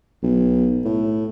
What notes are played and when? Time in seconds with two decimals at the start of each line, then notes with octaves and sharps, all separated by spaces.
0.23 B1
0.85 A2